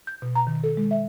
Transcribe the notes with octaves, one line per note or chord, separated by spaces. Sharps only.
G6
B2
A#5
D#3
A4
G#3
E5